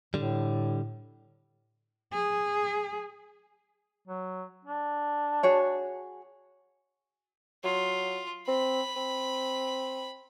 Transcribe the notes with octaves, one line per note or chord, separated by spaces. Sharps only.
A2 D3 G3
G#4
F#3
D4
F#4 G#4 C#5
F#3 F4
C4 B5
C4